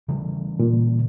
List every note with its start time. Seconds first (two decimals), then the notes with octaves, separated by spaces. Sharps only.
0.08 C#3 E3 G3
0.59 A#2